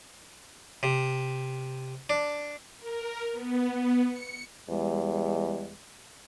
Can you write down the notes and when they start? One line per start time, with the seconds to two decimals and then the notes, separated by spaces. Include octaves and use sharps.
0.83 C3
2.10 D4
2.79 A#4
3.32 B3
4.06 C#7
4.69 E2 G3 G#3